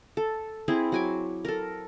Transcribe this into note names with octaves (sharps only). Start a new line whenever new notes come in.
A4
C4 E4 G#4
F#3 G#5 D6
A4 A#4